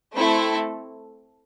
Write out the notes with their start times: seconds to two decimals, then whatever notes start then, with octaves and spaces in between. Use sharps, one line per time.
0.15 A3 C4 E4 A4